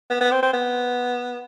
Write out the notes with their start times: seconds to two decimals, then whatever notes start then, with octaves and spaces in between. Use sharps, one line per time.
0.10 B3
0.21 B3
0.31 C4
0.42 C4
0.53 B3